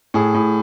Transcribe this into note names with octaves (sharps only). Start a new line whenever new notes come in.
A2 G#4
A2